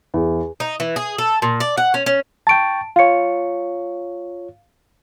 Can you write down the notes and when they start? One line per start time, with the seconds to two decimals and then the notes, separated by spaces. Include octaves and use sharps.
0.14 E2
0.60 D#4
0.80 E3
0.96 G#4
1.18 A4
1.42 A#2
1.60 D5
1.77 F#5
1.94 C#4
2.06 C#4
2.47 G5 A5 C#6 A6 D7
2.96 F4 C#5 F5 C#7